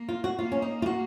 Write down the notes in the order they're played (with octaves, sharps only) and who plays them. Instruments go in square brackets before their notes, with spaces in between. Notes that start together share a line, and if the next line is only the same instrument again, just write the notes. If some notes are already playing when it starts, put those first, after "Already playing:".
Already playing: [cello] A#3
[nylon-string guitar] F4
F#4
[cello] A#3 [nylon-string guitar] F4
[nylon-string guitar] C#4
D#4
F4
F#4